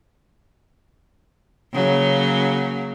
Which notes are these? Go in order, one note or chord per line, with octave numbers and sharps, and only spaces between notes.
C#3 F#3 A#3